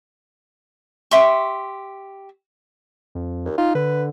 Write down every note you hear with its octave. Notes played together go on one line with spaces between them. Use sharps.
G4 E5 C6 C#6
F2
D#2
D#4 F4
D3 B4